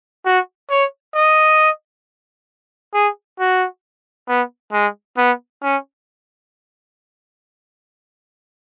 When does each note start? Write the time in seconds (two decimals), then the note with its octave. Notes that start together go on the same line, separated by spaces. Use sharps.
0.26 F#4
0.71 C#5
1.15 D#5
2.94 G#4
3.40 F#4
4.29 B3
4.73 G#3
5.17 B3
5.63 C#4